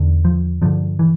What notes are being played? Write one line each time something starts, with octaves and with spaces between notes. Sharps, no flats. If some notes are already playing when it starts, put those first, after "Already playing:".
Already playing: E2 D3
F3
G2 D3 F3
E3